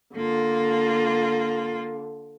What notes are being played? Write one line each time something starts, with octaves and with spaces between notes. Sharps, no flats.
D3 A#3 F4